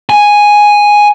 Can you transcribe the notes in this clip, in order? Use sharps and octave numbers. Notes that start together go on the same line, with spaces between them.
G#5